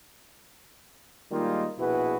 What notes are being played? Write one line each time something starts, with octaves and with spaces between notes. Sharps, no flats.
D#3 G3 G#3 A#3 D#4 F4
A#1 B2 E4 F#4 G#4 B4